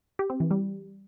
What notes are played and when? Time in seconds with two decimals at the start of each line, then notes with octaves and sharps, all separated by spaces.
0.19 G4
0.30 C4
0.40 E3
0.51 G3